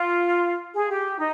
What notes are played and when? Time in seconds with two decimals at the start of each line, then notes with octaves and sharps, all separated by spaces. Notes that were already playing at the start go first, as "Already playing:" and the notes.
Already playing: F4
0.75 G#4
0.90 G4
1.18 D#4